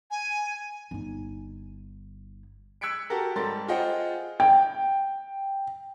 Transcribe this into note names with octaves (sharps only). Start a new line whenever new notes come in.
G#5
G1 D#4
E6 F#6 G#6 B6 C#7 D7
F#4 G4 A4 A#4
G#2 G3 A4 A#4 C6 A6
F4 G#4 C5 D#5 F#5 G5
G5